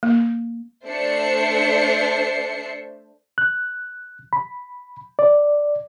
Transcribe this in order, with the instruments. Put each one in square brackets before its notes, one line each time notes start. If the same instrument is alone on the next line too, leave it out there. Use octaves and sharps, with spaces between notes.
[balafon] A#3
[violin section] A3 D4 C5 E5 C7 C#7
[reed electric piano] F#6
B5
D5